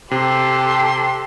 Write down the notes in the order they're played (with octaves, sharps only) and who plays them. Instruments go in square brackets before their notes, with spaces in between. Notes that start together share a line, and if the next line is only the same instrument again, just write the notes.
[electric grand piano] C3 [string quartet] G4 A4 [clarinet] G5 [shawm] C6